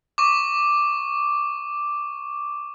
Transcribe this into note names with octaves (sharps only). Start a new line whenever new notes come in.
C#6 D6